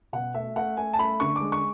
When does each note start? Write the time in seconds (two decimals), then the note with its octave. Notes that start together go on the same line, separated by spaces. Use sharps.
0.13 B2 F#5
0.34 A3 E5
0.56 A3 F#5
0.77 A3 G#5
0.94 A5
0.99 A3 B5
1.20 D3 C#6
1.36 G#3 D6
1.52 C#6